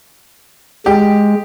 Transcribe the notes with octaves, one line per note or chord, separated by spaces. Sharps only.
G#3 G4